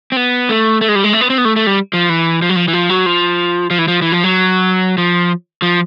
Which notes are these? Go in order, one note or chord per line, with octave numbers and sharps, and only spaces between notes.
C4
B3
A3
A3
G#3
G3
G#3
A3
B3
C4
B3
A3
A3
G3
F3
E3
F3
F#3
F3
E3
F3
F#3
F3
F3
E3
F3
E3
F3
F#3
F3
F3